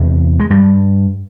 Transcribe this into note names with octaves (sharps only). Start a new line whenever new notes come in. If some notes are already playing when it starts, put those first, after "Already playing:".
Already playing: E2 C3
G#3
G2 G3